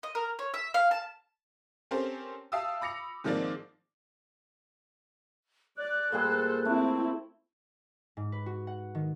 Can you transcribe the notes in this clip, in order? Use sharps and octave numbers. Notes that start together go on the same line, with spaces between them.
D#5
A#4
C#5
E5
F5
A5
C4 C#4 G4 A4 A#4 C5
E5 F5 G5 A5 D#6 E6
B5 D6 A#6 C#7 F7
G#2 D#3 F3 A#3 C4 D5
D5 F#6
A#2 G3 G#4 A4 C5
A3 C4 E4
G#2
B4
F#4
F#5
D#3